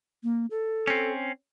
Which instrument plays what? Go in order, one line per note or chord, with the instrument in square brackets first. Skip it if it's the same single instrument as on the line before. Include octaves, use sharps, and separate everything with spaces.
[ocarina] A#3
A4
[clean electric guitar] C4 C#4